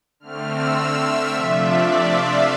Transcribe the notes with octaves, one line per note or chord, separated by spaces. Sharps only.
D3 A3 C4 F6
E6
E5
C3 F3 A3 D4 F4 E5
D5
E5
F5